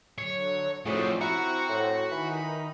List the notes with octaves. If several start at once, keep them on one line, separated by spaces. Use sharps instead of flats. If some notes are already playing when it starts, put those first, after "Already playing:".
D3 F#3 C#5
A2 F3 A3 F#4 G#4 C5 D5
C4 E4 F#4 F#5 A#5
A2
D#3 E3 D#4 B5